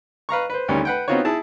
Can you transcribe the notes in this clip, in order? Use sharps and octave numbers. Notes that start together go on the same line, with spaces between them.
B4 F5 A#5 C#6
B4 C5
D2 D#3 G3 C#4
B4 F#5 G5
B3 C4 D#4 F4 F#4 C#5
E4 G#4 A5